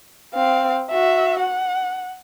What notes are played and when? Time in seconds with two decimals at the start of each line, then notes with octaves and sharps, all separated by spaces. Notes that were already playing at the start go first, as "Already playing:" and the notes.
0.34 C4 F5
0.90 F#4 E5
1.40 F#5